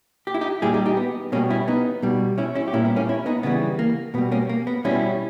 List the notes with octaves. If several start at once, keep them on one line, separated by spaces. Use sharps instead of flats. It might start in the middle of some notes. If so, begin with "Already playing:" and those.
G4
E4
D#4 G4
A#2 G3 E4 G#4
D#4 G4
D#4 G4
B3
B2 G3 A#3 C#4
C#4 E4
B3 D#4
B2 G3
C#4 E4
C#4 E4
G4
A#2 G3 C#4 E4
B3
A#3 C#4
C#4 E4
B3 D#4
C#3 E3 G3 B3
A#3
B2 G3 B3
A#3 C#4
A#3
B3
B2 G3 C#4 E4